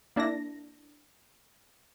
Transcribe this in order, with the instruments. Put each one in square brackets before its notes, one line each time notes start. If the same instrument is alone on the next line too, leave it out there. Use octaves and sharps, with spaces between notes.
[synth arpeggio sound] A#3 D4 E4 A5 A#6